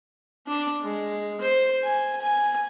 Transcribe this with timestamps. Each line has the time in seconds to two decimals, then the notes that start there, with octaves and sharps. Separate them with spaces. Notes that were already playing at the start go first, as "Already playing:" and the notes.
0.47 D4
0.82 G#3
1.41 C5
1.84 G#5
2.21 G#5